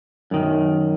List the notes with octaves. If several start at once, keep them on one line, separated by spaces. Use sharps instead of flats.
F#2 D#3